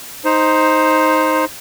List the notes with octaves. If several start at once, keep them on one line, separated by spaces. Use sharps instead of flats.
D#4 C5